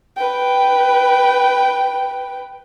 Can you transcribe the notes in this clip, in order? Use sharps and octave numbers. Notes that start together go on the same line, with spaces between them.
B4 G5